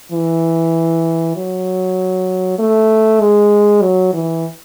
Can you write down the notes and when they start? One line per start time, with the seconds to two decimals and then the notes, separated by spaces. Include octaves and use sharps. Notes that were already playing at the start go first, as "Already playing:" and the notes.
0.12 E3
1.36 F#3
2.59 A3
3.20 G#3
3.82 F#3
4.13 E3